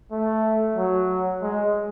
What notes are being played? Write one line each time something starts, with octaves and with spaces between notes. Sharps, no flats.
A3
F#3
G#3